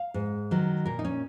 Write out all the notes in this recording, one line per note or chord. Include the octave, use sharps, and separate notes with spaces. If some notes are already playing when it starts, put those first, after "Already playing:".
Already playing: F5
G#2
D#3 F#3
A#2 A#4
D#4
C#4